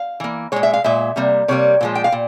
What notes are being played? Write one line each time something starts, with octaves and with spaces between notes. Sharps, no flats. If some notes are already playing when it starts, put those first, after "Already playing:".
Already playing: F5
E3 A#3
A#2 G#3 C#5
E5
F5
A#2 G#3 E5
C3 G3 A#3
C3 G3 A#3 C#5
A#2 F3 G#3
G5
F5
A#2